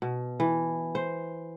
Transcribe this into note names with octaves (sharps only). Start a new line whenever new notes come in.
B2
E3
C5